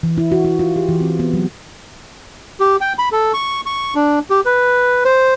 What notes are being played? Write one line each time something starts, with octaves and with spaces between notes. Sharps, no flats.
E3
E4
F#4
F#4
F4
G4
E3
C4
B3
F#3
G4
G5
B5
A4
C#6
C#6
D4
G4
B4
C5